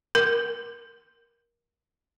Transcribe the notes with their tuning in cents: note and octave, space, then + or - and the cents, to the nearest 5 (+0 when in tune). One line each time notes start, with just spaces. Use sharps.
A#4 +20